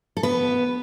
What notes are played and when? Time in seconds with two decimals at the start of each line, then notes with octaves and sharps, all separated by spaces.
0.17 A4
0.23 B3 B4